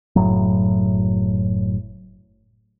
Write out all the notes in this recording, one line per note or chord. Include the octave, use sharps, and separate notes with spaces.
F#1 A2 F#3